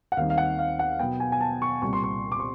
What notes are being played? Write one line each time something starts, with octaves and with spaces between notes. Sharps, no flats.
F#5
D#2 D#3 G3 C4 D#4 F5
F5
F#5
F5
F#5
B2 F#3 B3 G5
G#5
G#5
A5
C#6
C2 A#2 G3 C#6
C6
C#6
D6
C#6